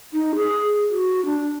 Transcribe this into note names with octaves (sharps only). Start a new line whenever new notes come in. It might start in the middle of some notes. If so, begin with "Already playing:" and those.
D#4
G#4
F#4
D4